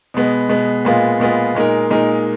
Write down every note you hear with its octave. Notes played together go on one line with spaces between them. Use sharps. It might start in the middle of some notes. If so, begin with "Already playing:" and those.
B2 G#3 B3
B2 G#3 B3
A#2 G#3 B3 F4
A#2 G#3 B3 F4
A#2 G#3 D#4 A#4
A#2 G#3 D#4 A#4